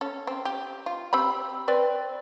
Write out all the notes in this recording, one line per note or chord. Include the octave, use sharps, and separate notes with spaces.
C#4 A4
C4
G4
F4
C4 G4 B5
C4 B4 D5